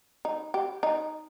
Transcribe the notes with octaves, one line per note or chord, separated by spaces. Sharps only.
D#4
G4
D#4